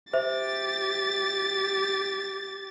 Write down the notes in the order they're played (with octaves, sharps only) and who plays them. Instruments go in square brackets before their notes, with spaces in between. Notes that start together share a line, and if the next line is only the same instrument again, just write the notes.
[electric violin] G4 A6 [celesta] C5 E5